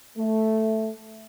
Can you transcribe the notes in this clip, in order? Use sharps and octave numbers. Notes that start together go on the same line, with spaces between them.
A3